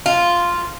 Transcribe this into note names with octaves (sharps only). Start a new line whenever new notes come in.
F4